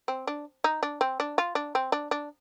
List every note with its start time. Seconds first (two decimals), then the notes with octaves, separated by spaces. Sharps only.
0.08 C4
0.27 D4
0.64 D#4
0.83 D4
1.01 C4
1.20 D4
1.38 F4
1.55 D4
1.75 C4
1.92 D4
2.11 D4